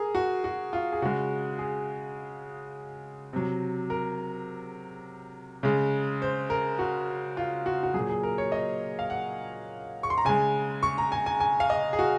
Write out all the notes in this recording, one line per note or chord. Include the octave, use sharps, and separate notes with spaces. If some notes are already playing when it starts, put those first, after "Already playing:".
Already playing: G#4 A#4
F#4
F#4
F4
G#4
C#3 G#3 F#4
G#4
C3 F#3
A#4
C#3 G#3
C5
A#4
F#4
F4
F#4
F#4
A#2 F#3 G#4
G#4
A#4
C#5
D#5
F5
F#5
C#6
C6
A#5
C#3 G#3 G#5
C#6
A#5
G#5
G#5
G#5
F5
D#5
G#4
F#4